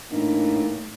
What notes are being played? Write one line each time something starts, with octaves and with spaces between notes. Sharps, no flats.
A2 E3 A#3 D4 D#4